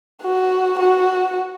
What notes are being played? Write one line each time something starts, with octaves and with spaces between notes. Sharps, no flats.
F#4
F#4